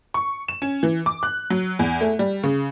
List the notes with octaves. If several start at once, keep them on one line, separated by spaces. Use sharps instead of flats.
C#6
E7
C#4
E3
D6
F#6
F#3
E2
A3
G3
C#3